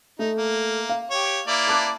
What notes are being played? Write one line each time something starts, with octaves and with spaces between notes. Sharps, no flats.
A3 D#4
A#3
F5
G4 C#5
A#3 E4 D5
A5 D6 F#6